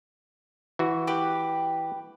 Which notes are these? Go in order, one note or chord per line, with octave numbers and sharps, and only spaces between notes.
E3 F#4
G4 B4